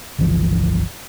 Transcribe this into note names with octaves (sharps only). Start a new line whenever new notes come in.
G1 C#2 E3 F3